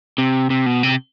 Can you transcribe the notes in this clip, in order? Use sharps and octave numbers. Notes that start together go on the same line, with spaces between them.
C3
C3
B2
C3